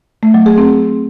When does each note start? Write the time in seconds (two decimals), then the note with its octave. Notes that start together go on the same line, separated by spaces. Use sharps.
0.23 A3
0.34 F#3
0.46 G#4
0.58 C4